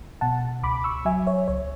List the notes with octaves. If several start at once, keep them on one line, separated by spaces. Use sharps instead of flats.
B2 F#5 A5
C#2 B5 D6
C#6 E6
F#3 E5 G#5
C#5 E5
C#2 C#5